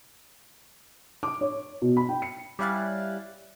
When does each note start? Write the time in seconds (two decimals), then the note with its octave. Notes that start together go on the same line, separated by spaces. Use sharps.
1.23 D6
1.41 C#5
1.82 B2
1.97 B5
2.09 G5
2.22 C#7
2.59 G3 C#4 E4 F5 F#6 A6